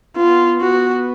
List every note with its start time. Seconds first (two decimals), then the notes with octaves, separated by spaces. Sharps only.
0.17 B3 F4
0.61 B3 F#4